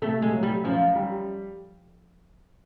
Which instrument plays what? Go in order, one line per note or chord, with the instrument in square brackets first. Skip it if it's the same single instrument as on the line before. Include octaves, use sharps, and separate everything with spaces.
[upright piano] C3 [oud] A3
[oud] G#3
[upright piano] F#3
[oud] G3
[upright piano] F#2 [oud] F3
[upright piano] G3